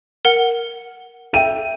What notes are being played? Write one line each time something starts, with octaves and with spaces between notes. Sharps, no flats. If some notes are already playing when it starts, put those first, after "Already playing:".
A#4 F#5
E5 G5 D#7